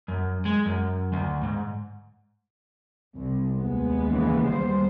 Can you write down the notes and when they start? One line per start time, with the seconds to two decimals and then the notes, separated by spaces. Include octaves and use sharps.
0.08 F#2
0.45 G#3
0.66 F#2
1.13 D2
1.43 G#2
3.17 C2
3.59 D#2 G#3 B3
4.08 C#3 E3
4.44 G3 C5